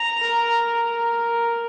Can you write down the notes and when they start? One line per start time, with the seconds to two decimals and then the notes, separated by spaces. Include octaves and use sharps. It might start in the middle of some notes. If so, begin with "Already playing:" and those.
Already playing: A#5
0.20 A#4